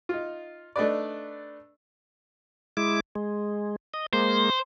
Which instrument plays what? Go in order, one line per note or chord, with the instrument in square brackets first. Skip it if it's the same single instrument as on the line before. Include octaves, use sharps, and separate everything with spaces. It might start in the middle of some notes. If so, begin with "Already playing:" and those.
[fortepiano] D#4 F4
A3 D4 D#4 B4 D5
[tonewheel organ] G#3 E4 D6
G#3
D#5
[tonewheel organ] G#3 A#3 [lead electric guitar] C5